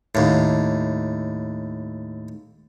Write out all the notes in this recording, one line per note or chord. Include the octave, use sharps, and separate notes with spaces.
D#2 A2